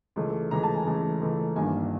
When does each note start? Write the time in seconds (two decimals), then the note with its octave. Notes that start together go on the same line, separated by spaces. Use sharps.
0.16 C#2 C#3 E3 A3
0.51 C#2 C#3 E3 A3 A#5
0.63 A5
0.74 G#5
0.86 C#2 C#3 E3 A3
1.21 C#2 C#3 E3 A3
1.56 G1 G2 D#3 G3 A#3 G#5